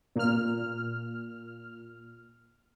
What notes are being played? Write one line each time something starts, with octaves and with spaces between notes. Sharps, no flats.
A#2 F6